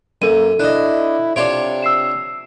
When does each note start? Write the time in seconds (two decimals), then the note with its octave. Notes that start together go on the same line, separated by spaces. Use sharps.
0.22 F#2 A#3 A4 D#7
0.60 D4 E4 D#5 F#6
1.36 C3 D4 F4 C#5 D7
1.82 E6 C7 E7